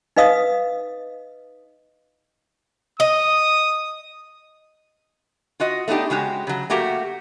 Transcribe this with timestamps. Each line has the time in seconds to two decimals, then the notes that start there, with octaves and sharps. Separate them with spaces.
0.16 D#4 B4 D#5 F5 D#6
3.00 D#5 D#6
5.60 F4 F#4 D#5
5.88 A3 B3 D4 D#4 G4
6.10 C#3 G#3 F#4 G4
6.47 C#3 F#3
6.70 A3 A#3 F#4 G4 A#4